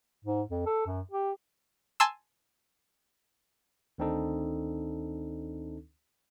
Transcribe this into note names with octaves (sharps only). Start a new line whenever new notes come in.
G#2
F2
A4
F#2
G4
G#5 A5 C6 E6
D2 D#3 C4 D4 D#4 A4